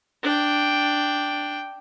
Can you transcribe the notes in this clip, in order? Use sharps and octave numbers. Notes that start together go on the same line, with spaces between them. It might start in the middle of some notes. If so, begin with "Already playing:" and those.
D4 G5